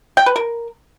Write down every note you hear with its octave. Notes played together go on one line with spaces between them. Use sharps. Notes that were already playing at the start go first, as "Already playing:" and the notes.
G5
B4
A#4